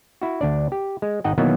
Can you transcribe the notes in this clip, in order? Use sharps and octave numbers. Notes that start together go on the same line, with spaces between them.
E4 F#4
D2 D4 D5
G4
G#3
G#1 D#4 D#5 F#5 G5
B2 D#3 E3 F#3 A#3 B3